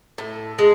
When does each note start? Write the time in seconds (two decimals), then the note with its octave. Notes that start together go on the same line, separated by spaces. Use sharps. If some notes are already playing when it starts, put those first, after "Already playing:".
0.18 A2
0.59 G#3